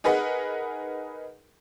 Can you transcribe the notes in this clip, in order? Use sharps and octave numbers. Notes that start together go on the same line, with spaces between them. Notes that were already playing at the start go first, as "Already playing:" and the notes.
D#4 G#4 A#4 B4 D#5 F#5